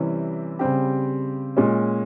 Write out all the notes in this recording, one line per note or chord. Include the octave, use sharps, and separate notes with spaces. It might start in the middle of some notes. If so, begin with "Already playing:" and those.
Already playing: C3 E3 G3 C#4 E4
C#3 G3 C4 G4
A#2 G#3 C#4